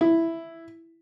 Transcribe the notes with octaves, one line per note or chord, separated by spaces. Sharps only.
E4